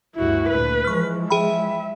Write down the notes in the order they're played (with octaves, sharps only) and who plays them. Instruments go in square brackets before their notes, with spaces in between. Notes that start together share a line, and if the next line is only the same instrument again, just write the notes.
[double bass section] D2 G2 [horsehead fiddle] E4 F#4
[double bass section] D2 A#2 A3 [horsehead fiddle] B4
[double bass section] E3 F3 G#3 [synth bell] C#6 F6
[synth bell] G#4 G5 B5 [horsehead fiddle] E5